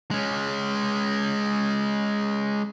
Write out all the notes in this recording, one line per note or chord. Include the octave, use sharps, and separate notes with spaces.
G#3 C#4